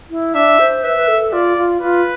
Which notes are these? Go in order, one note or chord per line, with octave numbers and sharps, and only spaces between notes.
E4
D4 E5
C5
B4 E5
B4
A4
F4 D5
F4
F4 B4